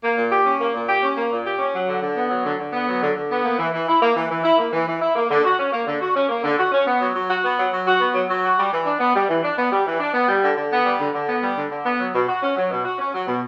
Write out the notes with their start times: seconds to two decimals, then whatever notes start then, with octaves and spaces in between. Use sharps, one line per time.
0.02 A#3
0.16 A#2
0.31 G4
0.45 C#4
0.59 A#3
0.73 A#2
0.88 G4
1.02 C#4
1.16 A#3
1.31 A#2
1.45 G4
1.58 C#4
1.73 F#3
1.87 D3
2.01 D3
2.15 B3
2.30 F#3
2.44 D3
2.58 D3
2.73 B3
2.87 F#3
3.01 D3
3.15 D3
3.29 B3
3.43 A#3
3.58 E3
3.73 E3
3.87 E4
4.02 A#3
4.15 E3
4.30 E3
4.44 E4
4.58 A#3
4.72 E3
4.86 E3
5.01 E4
5.15 A#3
5.30 D3
5.43 F#4
5.58 C#4
5.72 A#3
5.86 D3
6.00 F#4
6.15 C#4
6.29 A#3
6.43 D3
6.58 F#4
6.72 C#4
6.86 B3
7.00 F#3
7.14 F#3
7.29 F#4
7.43 B3
7.58 F#3
7.71 F#3
7.86 F#4
8.00 B3
8.14 F#3
8.29 F#3
8.43 F#4
8.57 G3
8.72 E3
8.85 D4
9.00 B3
9.14 G3
9.28 E3
9.43 D4
9.57 B3
9.71 G3
9.85 E3
9.99 D4
10.13 B3
10.28 G3
10.42 D3
10.56 D3
10.71 B3
10.85 G3
11.00 D3
11.13 D3
11.28 B3
11.42 G3
11.56 D3
11.70 D3
11.85 B3
11.99 F#3
12.14 B2
12.28 F#4
12.42 C#4
12.56 F#3
12.70 B2
12.84 F#4
12.99 C#4
13.13 F#3
13.27 B2